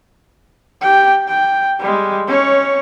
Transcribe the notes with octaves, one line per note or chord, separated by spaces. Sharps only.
G4 G5
G5
G3 G#3
C#4 C#5